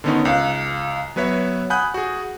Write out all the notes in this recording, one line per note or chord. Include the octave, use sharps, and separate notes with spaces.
D3 D#3 B3 C#4 D#4
C#2 F5 F#6
F#3 B3 B4 C#5 E5
F#5 G#5 B5 D#6 F#6 G6
F#4 G#4